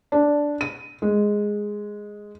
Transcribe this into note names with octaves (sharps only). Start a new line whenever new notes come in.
D4
D#7
G#3